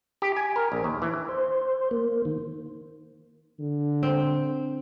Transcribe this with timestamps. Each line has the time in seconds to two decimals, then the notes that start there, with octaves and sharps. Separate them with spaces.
0.22 G4
0.37 G#5
0.56 A#4
0.72 A#1
0.84 D#2
1.02 E3
1.29 C5
1.91 A#3
2.25 D#3
3.59 D3
4.03 C4